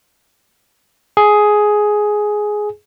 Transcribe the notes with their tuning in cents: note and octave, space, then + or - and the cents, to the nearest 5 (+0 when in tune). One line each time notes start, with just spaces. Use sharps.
G#4 +10